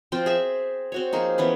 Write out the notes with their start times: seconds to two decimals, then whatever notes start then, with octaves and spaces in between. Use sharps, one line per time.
0.12 F3 C4 F4 G5
0.26 G#4 E5
0.92 C4 F#4 C#5
1.13 F3 A#3 D#4 G#4
1.38 E3 B3 C#4 B4